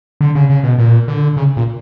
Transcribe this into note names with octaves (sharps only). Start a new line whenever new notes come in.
D3
C#3
C#3
B2
A#2
D3
C#3
A#2